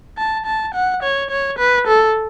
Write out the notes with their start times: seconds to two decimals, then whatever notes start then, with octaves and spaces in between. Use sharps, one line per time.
0.18 A5
0.46 A5
0.74 F#5
1.03 C#5
1.30 C#5
1.59 B4
1.87 A4